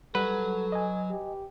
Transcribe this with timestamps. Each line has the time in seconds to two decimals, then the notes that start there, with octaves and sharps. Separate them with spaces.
0.15 F#3 G3 A4 B4 F#5
0.72 D#5 G#5
1.11 G4